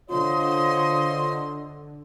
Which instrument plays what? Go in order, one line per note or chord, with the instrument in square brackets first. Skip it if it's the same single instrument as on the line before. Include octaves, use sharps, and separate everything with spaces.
[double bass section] D3 [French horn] F4 [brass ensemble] C5 C#5 D#5 [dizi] C6